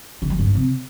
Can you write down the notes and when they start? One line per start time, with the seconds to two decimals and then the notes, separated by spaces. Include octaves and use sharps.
0.22 D3
0.30 G3
0.38 G2
0.47 G#2
0.55 C3